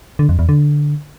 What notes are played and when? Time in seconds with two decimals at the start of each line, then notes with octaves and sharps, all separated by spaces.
0.19 D3
0.29 F2
0.39 E2
0.49 D3